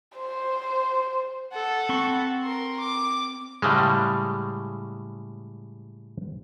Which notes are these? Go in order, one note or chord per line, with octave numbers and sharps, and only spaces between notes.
C5
A4 F#5
C4 B5 C#6
A#4 C6
D6
A2 C#3 G3 G#3